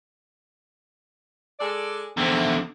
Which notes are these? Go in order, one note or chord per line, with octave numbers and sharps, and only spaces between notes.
G#3 A4 D5
E2 D3 C4 E4